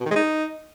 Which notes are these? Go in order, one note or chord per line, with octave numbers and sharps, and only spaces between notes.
B2
D#3
G#3
D#4